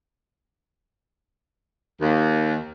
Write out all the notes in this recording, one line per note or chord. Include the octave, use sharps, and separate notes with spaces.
D#2